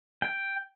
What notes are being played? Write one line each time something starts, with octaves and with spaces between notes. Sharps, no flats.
G5